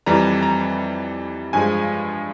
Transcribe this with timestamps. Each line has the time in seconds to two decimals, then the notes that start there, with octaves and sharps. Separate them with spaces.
0.06 F2 E3 G3 A#5
0.43 A#5
1.53 G2 F3 G#3 G#5